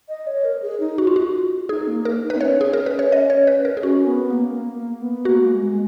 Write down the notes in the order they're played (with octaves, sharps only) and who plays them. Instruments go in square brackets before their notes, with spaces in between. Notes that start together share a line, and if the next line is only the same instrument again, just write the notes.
[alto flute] D#5
C#5
A#4
G#4
D#4
[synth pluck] F#4
F4
F#4
[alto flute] D#4 [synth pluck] G#4
[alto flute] A#3
[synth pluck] A#4
[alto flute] D#4
[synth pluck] B4
[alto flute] B3
[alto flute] C#4 [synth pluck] C#5
[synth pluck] G#4
A#4
B4
C#5
D#5
C#5
B4
A#4
G#4
[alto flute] C#4 [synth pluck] F#4
[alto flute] B3
A#3
A#3
A#3
B3
[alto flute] A#3 [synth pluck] F#4
[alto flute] G#3
G#3